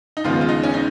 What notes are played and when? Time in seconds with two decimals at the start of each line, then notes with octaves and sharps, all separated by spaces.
0.17 D#4
0.24 D#2 C#3 F3 G#3 B3 F4
0.41 F4
0.49 D#4
0.64 C#4
0.74 D#4